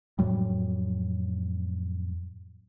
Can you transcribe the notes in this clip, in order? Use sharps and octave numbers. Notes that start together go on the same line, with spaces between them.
F2 A2 F#3 G3